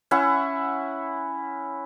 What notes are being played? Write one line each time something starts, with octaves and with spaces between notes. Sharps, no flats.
C#4 E4 F#5 C#6